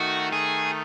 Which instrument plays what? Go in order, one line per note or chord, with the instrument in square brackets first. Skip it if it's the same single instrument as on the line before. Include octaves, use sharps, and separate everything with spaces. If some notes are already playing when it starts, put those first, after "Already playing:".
Already playing: [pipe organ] D#3 A3 D#4 [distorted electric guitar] F#4
[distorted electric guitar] G#4